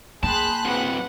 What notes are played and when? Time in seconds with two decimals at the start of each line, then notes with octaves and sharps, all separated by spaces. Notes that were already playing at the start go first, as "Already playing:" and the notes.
0.23 A#3 G#4 G5 A5 B5 C6 F#6
0.65 F#3 C4 B4 F#5